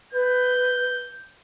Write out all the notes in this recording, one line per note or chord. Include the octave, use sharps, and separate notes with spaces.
B4 G6